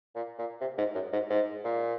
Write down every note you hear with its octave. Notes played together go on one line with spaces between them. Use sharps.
A#2
A#2
C3
G#2
F#2
G#2
G#2
A#2